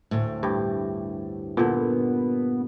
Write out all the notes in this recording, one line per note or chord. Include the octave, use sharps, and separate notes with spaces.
D2 A2
G2 G4
A#2 D3 B3